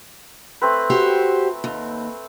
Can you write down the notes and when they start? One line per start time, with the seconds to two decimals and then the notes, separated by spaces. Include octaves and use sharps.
0.61 A3 C4 B4
0.90 F#4 G4 C5
1.64 D#2